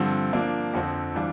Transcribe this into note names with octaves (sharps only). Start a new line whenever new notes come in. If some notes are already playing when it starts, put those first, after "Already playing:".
Already playing: G2 D3 F3 C4
F3 A#3 D4
F2 D3 F3 C4
E3 G3 D4 F4